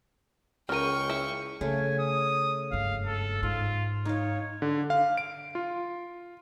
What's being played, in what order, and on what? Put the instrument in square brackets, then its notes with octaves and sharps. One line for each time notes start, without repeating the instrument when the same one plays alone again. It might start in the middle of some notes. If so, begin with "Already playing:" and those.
[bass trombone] C#2 [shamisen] C#3 A#4 [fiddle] G5 C#6 [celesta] F6 D#7
[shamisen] E4
[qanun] C#3 A3 [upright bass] C#4 [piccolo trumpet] G#5
[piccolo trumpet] D#6
[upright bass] F#1 G2 [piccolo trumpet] F5
[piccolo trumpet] A4
[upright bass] G#2 [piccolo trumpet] F4
[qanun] D#4 F5 [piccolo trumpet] C#5
[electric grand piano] D3
F5
D7
F4